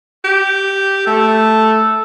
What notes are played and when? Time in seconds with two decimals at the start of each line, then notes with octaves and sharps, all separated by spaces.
0.25 G4
1.07 A3 A4